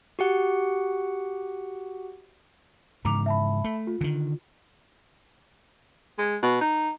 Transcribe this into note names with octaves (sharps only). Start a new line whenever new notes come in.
F#4 G4 F#5
G#2 C#3 E3 A#5 D6 F7
E5 A5 B5
A3
F4
D3 D#3
G#3
B2
D#4